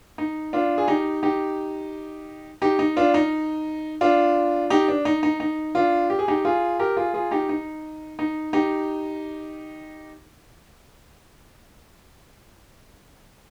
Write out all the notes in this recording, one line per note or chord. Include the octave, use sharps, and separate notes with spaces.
D#4
D4 F4
G#4
D#4 G4
D#4 G4
D#4 G4
D#4
D4 F4
D#4
D4 F4
D#4 G4
D4
D#4
D#4
D#4
D4 F4
G4
G#4
D#4 G4
F4 G#4
G4 A#4
F4 G#4
F4 G#4
D#4 G4
D#4
D#4
D#4 G4